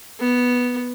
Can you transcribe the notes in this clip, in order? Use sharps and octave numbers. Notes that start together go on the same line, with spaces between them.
B3